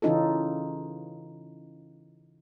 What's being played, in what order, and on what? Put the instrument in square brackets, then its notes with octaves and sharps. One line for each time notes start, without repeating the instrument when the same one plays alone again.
[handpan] C#3 E3 C#4 D#4 F4 A4